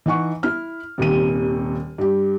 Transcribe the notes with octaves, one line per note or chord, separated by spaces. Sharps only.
E3 D#4 F#5 C#6
E4 F6
D#1 D#2 C3 D#7
G2 G4